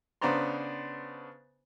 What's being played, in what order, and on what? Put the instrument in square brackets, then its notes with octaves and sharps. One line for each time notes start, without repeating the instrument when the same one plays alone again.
[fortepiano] C#3 B3 D4 C5 A#5 C6